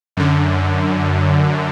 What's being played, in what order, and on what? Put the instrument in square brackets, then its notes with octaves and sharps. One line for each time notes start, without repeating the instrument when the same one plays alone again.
[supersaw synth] F#2 D3